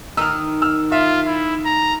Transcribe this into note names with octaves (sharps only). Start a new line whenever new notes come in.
D#3 D#4 E6 F6
E6 F6
F4 E5
E4
A#5